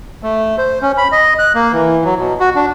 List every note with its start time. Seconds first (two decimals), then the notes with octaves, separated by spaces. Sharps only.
0.23 A3
0.58 C5
0.82 C#4
0.98 B5
1.12 D#5
1.39 F#6
1.55 A#3
1.73 E3
2.05 F#3
2.18 B2
2.40 F#4
2.56 D4